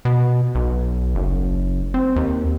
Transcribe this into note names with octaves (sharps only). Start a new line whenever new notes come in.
B2
B1
F#1
C4
D#2